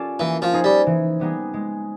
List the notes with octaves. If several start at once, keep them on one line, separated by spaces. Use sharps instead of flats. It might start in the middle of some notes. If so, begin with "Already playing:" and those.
Already playing: C#4 F4 G4 A4 D5
E3 A#3
F3
D#4 G#4 C5
G3
E3
G3 B3 D#4 G#4
G#3